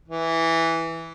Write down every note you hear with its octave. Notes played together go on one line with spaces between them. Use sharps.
E3